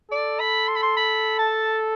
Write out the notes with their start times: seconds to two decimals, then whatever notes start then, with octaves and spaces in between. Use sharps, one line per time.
0.11 A4 D5
0.39 B5
0.68 C6
0.76 B5
0.82 C6
0.96 B5
1.39 A5